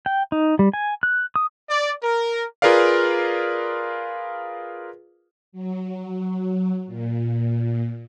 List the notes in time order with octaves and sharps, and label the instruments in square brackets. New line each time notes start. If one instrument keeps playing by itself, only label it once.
[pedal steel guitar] G5
D#4
G3
G#5
F#6
D#6
[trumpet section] D5
A#4
[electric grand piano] F4 G#4 A#4 B4 D5 F5
[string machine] F#3
A#2